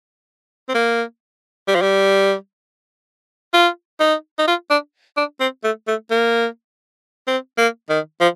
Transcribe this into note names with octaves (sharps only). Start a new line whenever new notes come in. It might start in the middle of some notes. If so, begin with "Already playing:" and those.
C4
A#3
G3
F3
G3
F4
D#4
D#4
F4
D4
D4
C4
A3
A3
A#3
C4
A#3
D#3
F3